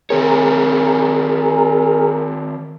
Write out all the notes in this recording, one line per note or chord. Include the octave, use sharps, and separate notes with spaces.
D#3 C4 G#4 A#4 C#5